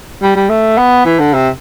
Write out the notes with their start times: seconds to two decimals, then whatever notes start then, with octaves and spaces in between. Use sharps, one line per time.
0.22 G3
0.36 G3
0.49 A3
0.77 B3
1.05 E3
1.19 D3
1.34 C3